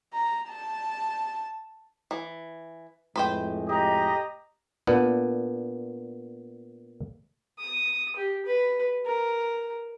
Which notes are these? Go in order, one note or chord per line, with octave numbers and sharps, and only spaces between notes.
A#5
A5
E3
F2 A2 G#3 B4 C5 G5
G4 D#5 A#5
A#2 B3 D4
D#6
G4
B4
A#4